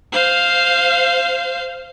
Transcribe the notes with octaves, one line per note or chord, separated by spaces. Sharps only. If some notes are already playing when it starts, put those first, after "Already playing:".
C5 F5